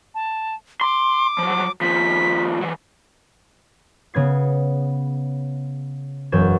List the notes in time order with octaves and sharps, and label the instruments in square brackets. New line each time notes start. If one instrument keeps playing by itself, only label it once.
[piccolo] A5
[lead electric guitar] C6 [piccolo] D6
[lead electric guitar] F3 F#3
[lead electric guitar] D#2 F3 [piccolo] B6
[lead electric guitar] E3 F#3
[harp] C#3 B3 G#6 C7
E1 F#2 B3 G6 G#6 E7